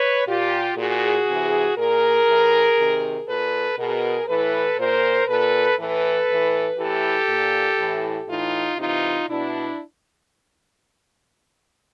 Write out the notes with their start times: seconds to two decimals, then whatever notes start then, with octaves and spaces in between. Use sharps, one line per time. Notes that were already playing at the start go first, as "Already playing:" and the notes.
Already playing: B4 C#5
0.27 A#2 F4 G4
0.77 A#2 F#4 G#4
1.27 C3 E3
1.78 A#2 G#4 A#4
2.27 A2 E3
2.78 C3 D#3
3.27 A#2 A4 B4
3.77 B2 G#4 A#4
4.28 A2 E3 A4 B4
4.78 A#2 A#4 C5
5.27 A#2 A4 B4
5.78 A2 E3 A4 B4
6.28 A2 E3
6.78 A2 E3 G4 A4
7.29 A#2
7.79 A2 E3
8.28 A2 E3 D#4 F4
8.78 C3 E3 D#4 F4
9.28 B2 D4 E4